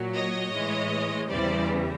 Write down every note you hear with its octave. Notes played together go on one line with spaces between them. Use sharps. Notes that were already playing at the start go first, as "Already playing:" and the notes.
Already playing: A#2 F#3
C#5 D#5
A2 E3 G#3
E2 C#3 E3 G3 C5 D5